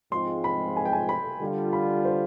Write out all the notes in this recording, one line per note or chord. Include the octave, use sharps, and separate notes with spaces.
G#2 F3 G#3 C4 F4 C6
B5
G#5
G5
G#5
B5
D3 G3 D4 F4
B5
C5